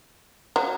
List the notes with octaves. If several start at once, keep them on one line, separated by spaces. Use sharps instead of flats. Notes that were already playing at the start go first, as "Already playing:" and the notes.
F#3